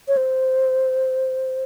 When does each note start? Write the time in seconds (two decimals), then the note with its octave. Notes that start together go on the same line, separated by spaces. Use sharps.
0.08 C#5
0.17 C5